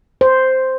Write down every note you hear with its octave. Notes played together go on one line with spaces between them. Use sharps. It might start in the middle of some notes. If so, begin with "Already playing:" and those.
C5